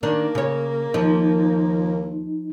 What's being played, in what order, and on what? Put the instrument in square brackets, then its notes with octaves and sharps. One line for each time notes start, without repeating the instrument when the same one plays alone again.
[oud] D#3 D4 [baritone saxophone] A#3
[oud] C#3 C#5
[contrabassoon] D#2 [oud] F3 [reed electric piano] D#4